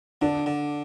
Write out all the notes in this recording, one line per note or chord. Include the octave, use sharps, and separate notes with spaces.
D3 D4
D3